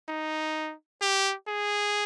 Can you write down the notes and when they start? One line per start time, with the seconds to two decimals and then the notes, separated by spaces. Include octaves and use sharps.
0.09 D#4
1.02 G4
1.48 G#4